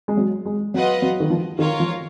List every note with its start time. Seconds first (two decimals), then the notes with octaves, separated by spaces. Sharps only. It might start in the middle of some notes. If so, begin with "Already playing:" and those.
0.08 G#3
0.17 F#3
0.46 G#3
0.74 F#3 F4 B4 D#5 F#5
1.02 F#3
1.20 D#3
1.30 F3
1.59 D#3 F4 A#4 C#5 F5
1.80 F3